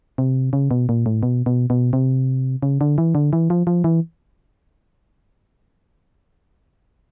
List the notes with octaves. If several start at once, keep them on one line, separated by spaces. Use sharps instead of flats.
C3
C#3
B2
A#2
A2
B2
B2
B2
C3
C#3
D3
E3
D3
E3
F3
F3
E3